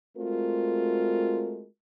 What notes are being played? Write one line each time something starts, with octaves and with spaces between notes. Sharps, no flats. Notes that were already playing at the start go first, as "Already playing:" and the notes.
G#3 A3 C4 F4 F#4 A#4